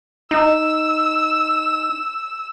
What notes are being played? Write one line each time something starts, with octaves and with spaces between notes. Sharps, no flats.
D#4 E6